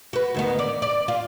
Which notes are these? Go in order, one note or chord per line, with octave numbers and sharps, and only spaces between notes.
F#4 B4
D2 D#3 B3
D5
D5
F4